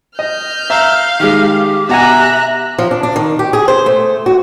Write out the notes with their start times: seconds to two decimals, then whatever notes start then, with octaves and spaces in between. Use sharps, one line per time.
0.19 D#5 F6 G6
0.70 E5 F5 A#5 E6
1.20 D#3 G#3 G4
1.89 B2 E5 F#5 G#5 A#5 F#6
2.79 F3
2.91 D4
3.03 D4
3.16 D#3
3.39 G4
3.53 G#4
3.68 C5
3.86 A3
4.26 F#4